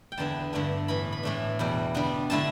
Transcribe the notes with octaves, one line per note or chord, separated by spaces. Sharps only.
G5
E2 D3 B3 E4 A5
G2 D3 A3 D4
A2 E3 B3 B5
B5
A2 E3 A3 D4
E2 B2 G3
D3 G3 B3 D4
D3 A3 E4 A5